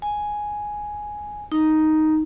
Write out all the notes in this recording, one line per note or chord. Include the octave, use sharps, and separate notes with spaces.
G#5
D#4